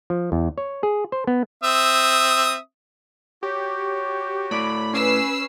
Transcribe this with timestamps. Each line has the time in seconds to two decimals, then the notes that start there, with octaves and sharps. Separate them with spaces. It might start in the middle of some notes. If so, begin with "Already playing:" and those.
0.10 F3
0.32 E2
0.58 C#5
0.83 G#4
1.12 C5
1.27 B3
1.64 C4 E5 D#6
3.43 F#4 G4 C#5
4.51 A2 A4 D5 B5
4.94 C#4 B4 E6 C7